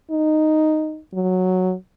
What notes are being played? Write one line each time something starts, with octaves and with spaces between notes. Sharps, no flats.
D#4
F#3